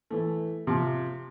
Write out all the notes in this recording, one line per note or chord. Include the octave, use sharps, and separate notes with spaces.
E3 A3
C3 F3